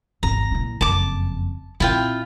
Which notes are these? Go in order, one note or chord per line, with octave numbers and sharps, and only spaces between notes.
G#1 E2 A#5
A#2 E4
F#1 F2 A5 D6
A#2 C4 E4 F4 G5